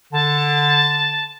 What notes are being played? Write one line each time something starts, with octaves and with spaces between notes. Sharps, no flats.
D3 A5